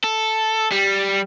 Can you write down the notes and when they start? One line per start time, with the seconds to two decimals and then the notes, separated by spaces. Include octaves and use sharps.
0.04 A4
0.71 G3